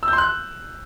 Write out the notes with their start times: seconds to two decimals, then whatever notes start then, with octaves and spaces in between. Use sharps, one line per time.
0.03 E6
0.08 G6
0.13 C6
0.18 F#6